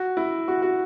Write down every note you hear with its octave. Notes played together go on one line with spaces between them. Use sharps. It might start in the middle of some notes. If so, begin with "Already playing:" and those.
Already playing: F#4
E4
F#4
F#4